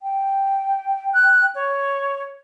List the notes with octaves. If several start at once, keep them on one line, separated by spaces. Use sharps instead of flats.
G5
F#6
C#5